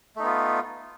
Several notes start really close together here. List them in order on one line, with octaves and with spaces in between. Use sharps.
A3 D#4 B3 F4